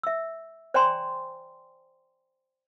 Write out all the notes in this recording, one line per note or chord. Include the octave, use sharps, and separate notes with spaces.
E5 E6
C5 D5 G5 G#5 A#5 C6